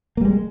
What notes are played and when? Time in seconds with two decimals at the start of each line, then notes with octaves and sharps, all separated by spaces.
0.17 A#3
0.21 G3
0.25 G#3